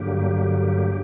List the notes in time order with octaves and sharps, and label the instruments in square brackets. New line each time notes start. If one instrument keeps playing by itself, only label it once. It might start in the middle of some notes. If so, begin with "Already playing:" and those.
Already playing: [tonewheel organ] G2 D3 F#3 A#3 G4